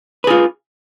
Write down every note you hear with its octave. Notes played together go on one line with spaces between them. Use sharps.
F4 G#4 B4